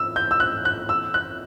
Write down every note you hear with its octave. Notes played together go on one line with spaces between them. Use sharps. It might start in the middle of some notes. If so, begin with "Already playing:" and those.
Already playing: E6
G6
E6
F#6
F#6
E6
F#6